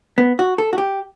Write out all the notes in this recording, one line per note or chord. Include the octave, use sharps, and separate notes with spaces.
B3
F#4
A4
F#4
G4